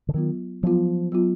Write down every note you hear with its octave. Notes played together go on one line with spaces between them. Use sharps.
D3
D#3 F#3 B3 F4
F3 F#3 B3 F4
F#3 B3 F4